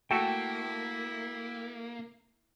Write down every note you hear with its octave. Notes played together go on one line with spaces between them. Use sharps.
A3 A#3 E4 F#4 A4 G5